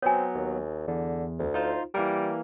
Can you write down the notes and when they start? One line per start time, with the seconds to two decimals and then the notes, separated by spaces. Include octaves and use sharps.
0.02 F#3 B3 C4 C#5 G#5
0.35 D#2
0.88 E2 D3
1.39 D2
1.54 D#4 F4 C5
1.94 E3 G3 A#3 A#4